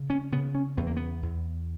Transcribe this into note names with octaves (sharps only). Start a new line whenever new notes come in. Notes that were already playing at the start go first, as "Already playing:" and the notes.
Already playing: C#3
C#4
C#3 B3
C#4
E2 B3
A#3
B3
E2